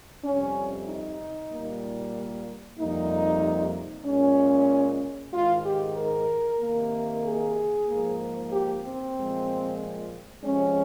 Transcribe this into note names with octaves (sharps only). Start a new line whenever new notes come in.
F2 C3 G3 C#4
D#4
A#2 G3 A#3
F2 C3 G3 A#3 D#4
A#2 G#3 C#4
G#2 D#3 G#3 F4
G4
A#4
C3 D#3 A#3
G#4
G#2 F3 A#3
G4
C4
A#2 F3 G#3
C3 F3 G#3 C#4